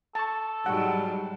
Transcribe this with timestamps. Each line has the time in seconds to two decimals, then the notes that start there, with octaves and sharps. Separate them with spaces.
0.15 A4 A5 C#6
0.66 G#2 F#3 G3 F#5 C#6